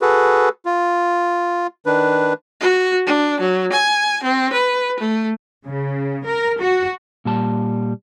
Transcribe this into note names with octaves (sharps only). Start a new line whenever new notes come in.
F#4 G#4 A4 B4
F4
D#3 D4 B4
F#4
D4
F#3
G#5
C4
B4
A3
C#3
A#4
F#4
A#2 G3 A5